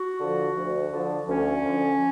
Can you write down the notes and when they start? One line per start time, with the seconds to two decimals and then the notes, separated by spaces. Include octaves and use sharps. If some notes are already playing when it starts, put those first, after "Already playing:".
Already playing: F#4
0.20 D3 F3
0.56 D2
0.92 D3 F3
1.28 D2 C#4
1.65 D3 F3